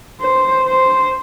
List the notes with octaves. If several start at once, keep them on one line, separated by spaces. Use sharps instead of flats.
C5
C5